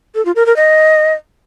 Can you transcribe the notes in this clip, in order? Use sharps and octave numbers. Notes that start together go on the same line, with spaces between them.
A4
F4
A#4
A#4
D#5